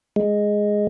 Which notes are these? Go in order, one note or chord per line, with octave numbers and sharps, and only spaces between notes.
G#3